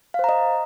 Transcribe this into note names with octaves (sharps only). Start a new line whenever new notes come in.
C5 D#5 F5 A#5